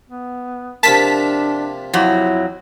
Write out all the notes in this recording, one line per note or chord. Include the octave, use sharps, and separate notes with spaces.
B3
C3 F3 A#3 D4 A5 B6
F2 F#3 E4